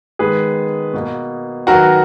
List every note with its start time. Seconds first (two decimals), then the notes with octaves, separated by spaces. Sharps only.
0.19 D#3 G#3 B3 G#4 B4
0.93 B2 A#3
1.67 D#3 F#3 B3 F#4 A#4